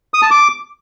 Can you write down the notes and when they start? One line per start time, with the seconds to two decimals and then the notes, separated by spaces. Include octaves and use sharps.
0.14 D#6
0.22 A5
0.31 D6